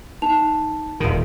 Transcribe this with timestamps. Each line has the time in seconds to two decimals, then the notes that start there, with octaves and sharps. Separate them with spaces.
0.22 D#4 A5 F7
1.00 D#1 D#3